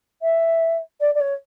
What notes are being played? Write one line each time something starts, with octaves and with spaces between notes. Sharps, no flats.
E5
D5
D5
C#5